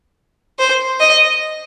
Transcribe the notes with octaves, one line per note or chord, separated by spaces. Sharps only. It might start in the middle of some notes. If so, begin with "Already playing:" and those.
C5
D#5